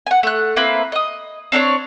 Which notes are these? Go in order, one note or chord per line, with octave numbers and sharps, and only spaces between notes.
F#5 G#5
A3 F#6
A#3 C4 E4 B4
D#5 D#6
C4 D4 A#4 C#5